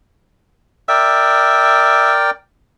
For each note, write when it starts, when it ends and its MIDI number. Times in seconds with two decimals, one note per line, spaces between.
0.89 2.30 70
0.89 2.30 74
0.89 2.12 76
0.89 2.30 79